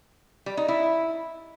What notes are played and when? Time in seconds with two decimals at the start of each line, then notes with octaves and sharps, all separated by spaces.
0.46 G3
0.57 D#4
0.68 E4